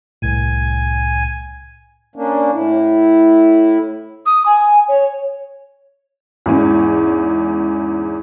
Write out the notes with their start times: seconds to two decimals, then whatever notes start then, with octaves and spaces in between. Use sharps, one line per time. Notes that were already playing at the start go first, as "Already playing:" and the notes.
0.22 C2 A2 G#5
2.16 A#3 C#4 D4
2.53 A2 E4
4.26 D#6
4.46 G#5
4.88 C#5
6.46 E2 G#2 C#4